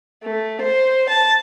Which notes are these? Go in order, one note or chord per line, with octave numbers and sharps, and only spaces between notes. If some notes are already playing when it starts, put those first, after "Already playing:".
A3
C5
A5